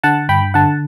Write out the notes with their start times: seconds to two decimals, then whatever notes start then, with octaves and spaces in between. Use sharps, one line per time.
0.04 D3 F#5 A5
0.29 G2 G5 B5
0.54 D3 F#5 A5